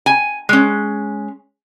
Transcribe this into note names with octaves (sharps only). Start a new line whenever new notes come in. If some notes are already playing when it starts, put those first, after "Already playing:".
G#5
G#3 C#4